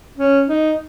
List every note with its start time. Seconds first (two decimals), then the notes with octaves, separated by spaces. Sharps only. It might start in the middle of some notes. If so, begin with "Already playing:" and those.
0.18 C#4
0.49 D#4